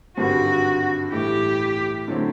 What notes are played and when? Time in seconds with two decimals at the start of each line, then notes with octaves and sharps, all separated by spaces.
0.17 G#1 G2 D3 G3 C4 F#4
1.12 A2 E3 G3 G4
2.08 D3 F#3 A3 C4 E4